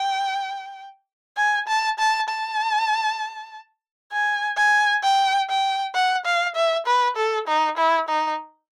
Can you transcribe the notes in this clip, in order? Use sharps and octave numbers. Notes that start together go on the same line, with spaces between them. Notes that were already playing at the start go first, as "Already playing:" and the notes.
Already playing: G5
G#5
A5
A5
A5
G#5
G#5
G5
G5
F#5
F5
E5
B4
A4
D#4
E4
D#4